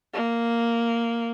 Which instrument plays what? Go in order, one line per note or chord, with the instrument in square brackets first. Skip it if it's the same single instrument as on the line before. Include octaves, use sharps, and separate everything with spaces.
[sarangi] A#3